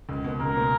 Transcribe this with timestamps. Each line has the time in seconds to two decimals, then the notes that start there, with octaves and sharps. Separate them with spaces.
0.09 C#2
0.24 B2 A#3
0.40 C#2 A#4
0.56 B2 A#3